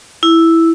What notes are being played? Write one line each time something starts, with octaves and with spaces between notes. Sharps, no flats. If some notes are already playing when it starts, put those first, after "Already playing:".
E4